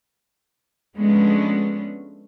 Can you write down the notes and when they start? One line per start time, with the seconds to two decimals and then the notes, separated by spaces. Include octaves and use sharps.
0.97 F3 G#3 A3 B3 C#4 D4